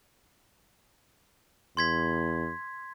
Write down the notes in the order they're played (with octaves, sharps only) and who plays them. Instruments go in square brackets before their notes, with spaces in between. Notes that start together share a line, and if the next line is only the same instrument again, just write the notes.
[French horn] E2 [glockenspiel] C6 G#6 B6